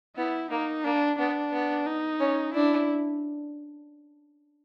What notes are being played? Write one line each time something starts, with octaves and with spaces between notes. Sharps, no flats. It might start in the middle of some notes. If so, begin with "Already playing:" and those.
B3 E4
A#3 D#4
A#3 D4
B3 D4
B3
D#4
C#4
D4 E4